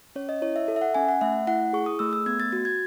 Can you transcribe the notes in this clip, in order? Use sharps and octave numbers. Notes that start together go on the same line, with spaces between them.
C#4 C#5
D#5
E4 C#5
E5
A4
E5
F#5
C#4 G#5
F#5
A3 E5
E4 F#5
G#4 C#6
D#6
A3 E6
E6
B3 G#6
A6
F#4 A6
G#6